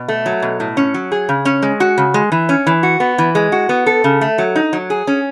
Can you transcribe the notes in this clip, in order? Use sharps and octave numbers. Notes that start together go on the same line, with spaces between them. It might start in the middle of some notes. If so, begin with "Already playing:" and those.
Already playing: B2
A3
F#3
B2
A2
C#4
F#3
G#4
C#3
C#4
G#3
F#4
C#3
G#3
E3
C#4
E3
F#4
B3
E3
G#3
F#4
B3
A4
C#3
A3
F#3
D#4
F#3
G#4
C#4